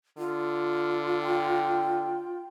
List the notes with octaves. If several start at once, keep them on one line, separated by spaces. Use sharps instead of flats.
D3 F4
G5